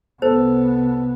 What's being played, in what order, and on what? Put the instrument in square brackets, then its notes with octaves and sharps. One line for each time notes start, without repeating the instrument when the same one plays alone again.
[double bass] C2 B3 [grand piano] A4 [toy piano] C5